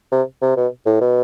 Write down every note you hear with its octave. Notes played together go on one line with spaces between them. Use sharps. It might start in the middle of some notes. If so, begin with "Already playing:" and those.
C3
C3
B2
A2
B2